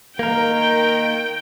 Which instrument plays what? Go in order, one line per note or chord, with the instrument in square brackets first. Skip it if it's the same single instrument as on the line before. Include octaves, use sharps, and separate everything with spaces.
[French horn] D#3 [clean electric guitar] A#3 A#4 [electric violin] G5